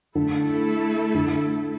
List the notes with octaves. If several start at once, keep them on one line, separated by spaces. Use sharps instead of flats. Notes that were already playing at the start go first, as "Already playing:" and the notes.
D3 A3 E4 A4
D3